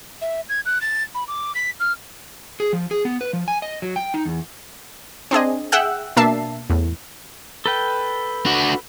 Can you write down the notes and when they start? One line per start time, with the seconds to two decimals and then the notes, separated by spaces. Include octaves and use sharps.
0.21 E5
0.49 G#6
0.66 F#6
0.81 A6
1.15 B5
1.28 D6
1.55 B6
1.80 F6
2.60 G#4
2.73 F3
2.91 G#4
3.05 B3
3.21 B4
3.33 F3
3.48 G#5
3.62 D#5
3.82 F#3
3.96 G5
4.14 D#4
4.25 E2
5.31 C4 D4 G#4 D#5
5.72 G#4 E5 F#5 G5 E6 F#6
6.16 B2 A#3 D4 E5 A5 C7
6.70 E2 A2
7.66 A4 B4 G5
8.46 D4 F#4